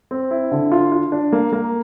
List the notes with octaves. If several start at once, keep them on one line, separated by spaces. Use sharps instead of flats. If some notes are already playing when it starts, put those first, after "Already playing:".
C4
E4
D3
F4
F4
D4
A#3
A#3